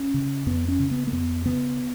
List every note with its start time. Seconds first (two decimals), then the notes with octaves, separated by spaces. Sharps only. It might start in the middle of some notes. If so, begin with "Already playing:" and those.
Already playing: C#4
0.14 C#3
0.46 F2 B3
0.68 C#4
0.79 C#3
0.91 B3
1.07 A#3
1.12 F2 B3
1.45 C#3 B3